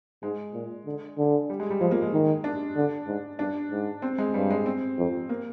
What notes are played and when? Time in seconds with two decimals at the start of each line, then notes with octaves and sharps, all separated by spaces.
0.23 G#2 G#3
0.54 A#2
0.86 D3
1.18 D3
1.49 G3
1.60 G#3
1.70 G3
1.81 F3 G#3
1.91 A#3
2.02 G#3
2.13 D#3
2.44 D4
2.76 D3
3.07 G#2
3.39 G2 D4
3.71 G#2
4.02 C4
4.18 G#3
4.34 G2 G3
4.50 G#3
4.66 C4
4.98 F2
5.29 A#3